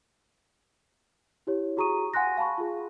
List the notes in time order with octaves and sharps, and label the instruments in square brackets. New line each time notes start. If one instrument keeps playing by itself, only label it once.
[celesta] E4 G4 C#5
F#4 G#4 A#5 C#6 D#6 D#7
F5 F#5 G#5 C6 F#6 A#6
F5 A5 B5 C#6
F4 G#4